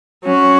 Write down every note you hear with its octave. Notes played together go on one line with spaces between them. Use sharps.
F#3 C#4 F#4